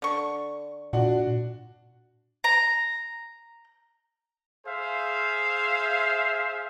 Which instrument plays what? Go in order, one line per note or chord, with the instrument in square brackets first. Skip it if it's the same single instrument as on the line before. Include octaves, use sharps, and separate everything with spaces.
[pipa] D3 C#6
[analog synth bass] A#2 [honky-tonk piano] D4 F#4 F#5
[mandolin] A#5
[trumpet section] G#4 C5 E5 F5